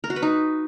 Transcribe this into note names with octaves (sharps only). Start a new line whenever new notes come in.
A#4
F#4
B4
D#4